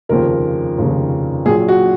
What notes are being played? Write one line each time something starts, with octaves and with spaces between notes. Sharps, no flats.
F1 D#2 C#3 F3 A#4
F1 D#2 C#3 F3
A#1 A#2 F#3 G#4
F#4